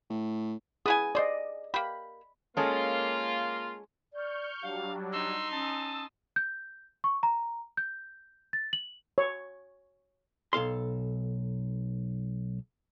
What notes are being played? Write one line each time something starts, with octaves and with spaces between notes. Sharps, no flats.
A2
B3 E4 G#4 G#5 D#6
G#4 C5 D5 D#5
A#3 G4 B5
G#3 A#3 C#4 F4 A4
D5 C#6 F6 G6
F#3 G3 D4 G4 F5
D#4 C6 E6
C#4 A5 D#6 E6
G6
C#6
A#5
G6
A6
F#7
C#5
B1 A4 F5 C6